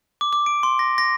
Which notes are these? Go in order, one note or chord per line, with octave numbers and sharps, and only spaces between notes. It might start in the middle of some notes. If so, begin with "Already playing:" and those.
D6
D6
D7
C6
A#6
A#6